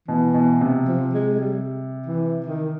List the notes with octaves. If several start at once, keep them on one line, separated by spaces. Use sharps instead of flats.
B2 E3
B2
C3
F3
G#3
G#3
G3
E3
D#3